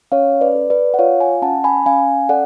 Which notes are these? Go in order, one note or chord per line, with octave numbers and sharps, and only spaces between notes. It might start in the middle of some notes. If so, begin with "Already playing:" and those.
C#4 C#5 F5
B4 D5
A4
B4 D5
F#5
F4 C#5 F5
F5 G#5
C#4 F#5 A5
G#5 B5
C#4 F5 G#5
A4 D5 F#5